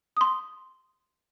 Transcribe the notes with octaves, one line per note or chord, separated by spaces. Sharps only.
C6 D#6